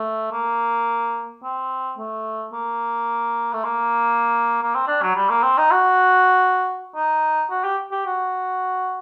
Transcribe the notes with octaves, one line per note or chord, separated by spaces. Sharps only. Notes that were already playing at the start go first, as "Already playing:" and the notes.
Already playing: A3
A#3
C4
A3
A#3
A3
A#3
A#3
C4
D4
F#3
G3
A#3
C4
D#4
F#4
D#4
F#4
G4
G4
F#4